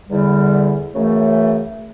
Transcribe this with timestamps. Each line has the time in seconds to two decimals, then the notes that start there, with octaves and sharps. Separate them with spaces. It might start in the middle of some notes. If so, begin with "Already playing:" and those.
0.08 E2 D3 G3
0.93 F#2 C#3 E3 A3